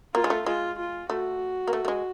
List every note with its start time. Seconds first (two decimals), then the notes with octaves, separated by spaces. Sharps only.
0.15 A#3 F4
0.24 G#3
0.30 A3
0.46 G#3 F4
0.78 F4
1.10 A3 F#4
1.67 A#3
1.73 A3
1.85 A3
1.88 G#3